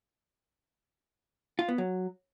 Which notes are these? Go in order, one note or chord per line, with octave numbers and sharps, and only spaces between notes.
F4
B3
F#3